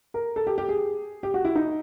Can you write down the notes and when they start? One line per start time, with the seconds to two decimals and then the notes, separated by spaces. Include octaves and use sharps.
0.14 A#4
0.36 A4
0.47 G4
0.58 G4
0.69 G#4
1.23 G4
1.34 F#4
1.45 E4
1.55 D#4